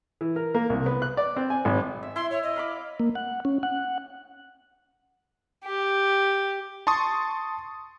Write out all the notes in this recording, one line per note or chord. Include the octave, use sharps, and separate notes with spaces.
E3
A#4
A#3
C2
B3
F#6
D5
C4
G#5
G#1
E5
E4 C6
C#5
D#5
F5 B5 D6
A#3
F#5
C#4
F#5
G4
A5 C6 C#6 D#6 A6